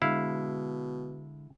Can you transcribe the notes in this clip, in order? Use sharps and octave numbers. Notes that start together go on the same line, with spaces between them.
B2 D3 G#3 E4 F5